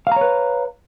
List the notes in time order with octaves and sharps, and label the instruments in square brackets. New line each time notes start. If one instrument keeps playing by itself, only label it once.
[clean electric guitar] F5
A#5
C#5
B4